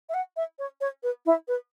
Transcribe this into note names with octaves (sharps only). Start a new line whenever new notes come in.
E5
F#5
E5
C#5
C#5
B4
E4
B4